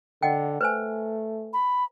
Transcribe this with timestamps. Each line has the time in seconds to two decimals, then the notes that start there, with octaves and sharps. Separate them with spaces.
0.23 D3 D#5 F#5 G5
0.61 A3 B4 C5 G#5
1.53 B5